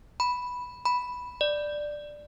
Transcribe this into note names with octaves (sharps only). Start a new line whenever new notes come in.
B5
B5
D5